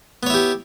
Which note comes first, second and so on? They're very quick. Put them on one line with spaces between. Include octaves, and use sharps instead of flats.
B3 C#5 E4 G4